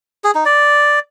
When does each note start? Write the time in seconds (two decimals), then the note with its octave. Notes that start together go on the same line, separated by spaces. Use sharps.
0.24 G#4
0.35 D#4
0.45 D5